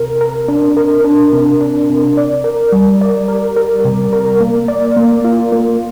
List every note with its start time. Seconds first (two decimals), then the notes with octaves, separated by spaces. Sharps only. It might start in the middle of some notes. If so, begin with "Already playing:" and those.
Already playing: C3 A#4
0.21 A#4
0.48 D4
0.77 A#4
1.04 D4
1.32 C3
1.61 D4
1.89 C3
2.17 D5
2.44 A#4
2.72 G3
3.01 D5
3.28 A#4
3.56 A#4
3.85 C3
4.13 A#4
4.41 A#3
4.68 D5
4.97 A#3
5.24 F4
5.52 A#3